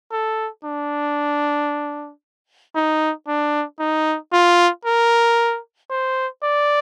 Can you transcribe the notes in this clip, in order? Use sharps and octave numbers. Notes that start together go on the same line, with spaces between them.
A4
D4
D#4
D4
D#4
F4
A#4
C5
D5